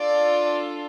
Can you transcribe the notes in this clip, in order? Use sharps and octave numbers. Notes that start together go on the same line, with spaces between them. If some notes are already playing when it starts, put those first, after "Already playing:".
Already playing: D4 F4 A4 D5